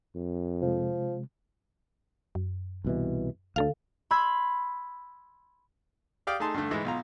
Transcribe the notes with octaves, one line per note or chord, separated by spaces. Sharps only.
F2
C3 F3 G#3
F#2
C2 B2 E3
D2 D3 A4 F5
B5 C6 E6 G#6
G4 D5 F5 G5 D6 D#6
A3 D#4 G#4 A5 C6
G2 D3 A3
G#2 E3 G#3 E4
B1 F4 A#5